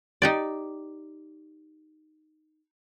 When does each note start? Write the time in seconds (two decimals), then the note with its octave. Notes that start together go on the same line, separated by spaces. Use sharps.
0.22 D#4 G4 D5